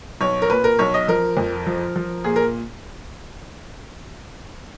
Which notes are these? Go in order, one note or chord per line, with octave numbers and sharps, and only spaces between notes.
B1 C#5
A#4
A#2 B4
A#4
B1 C#5
D#5
F3 A#4
F2
F3
F3
A#2 G#4
A#4